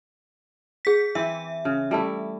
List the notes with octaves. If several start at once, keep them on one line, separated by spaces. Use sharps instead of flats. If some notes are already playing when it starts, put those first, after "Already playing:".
G#4 B6
E3 C4 E4 E5
C#3
G3 A3 E4